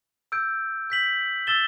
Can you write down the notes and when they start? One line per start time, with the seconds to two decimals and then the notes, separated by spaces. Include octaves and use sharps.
0.32 E6 G6 D7
0.90 G6 B6 F#7
1.47 E6 A6 E7 G7